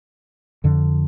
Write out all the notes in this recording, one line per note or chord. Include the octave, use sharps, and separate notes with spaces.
F2 D3